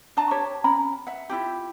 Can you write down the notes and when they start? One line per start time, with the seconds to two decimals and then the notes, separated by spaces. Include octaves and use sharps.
0.17 D4 D5 A5 A#5
0.31 G4 C#5
0.64 C#4 A#5 B5
1.07 E5 F#5
1.29 E4 F4 G4